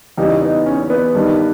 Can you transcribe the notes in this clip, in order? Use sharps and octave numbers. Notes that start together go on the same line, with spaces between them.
E2 C#3 E3 G3 D#4 G4
B3 D#4
C#4
B3
G2 D#3 G3